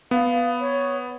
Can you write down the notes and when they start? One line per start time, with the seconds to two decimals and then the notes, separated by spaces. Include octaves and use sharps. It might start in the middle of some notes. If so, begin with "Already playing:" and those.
0.11 B3 F5
0.60 C#5